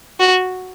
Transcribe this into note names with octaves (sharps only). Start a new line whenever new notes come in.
F#4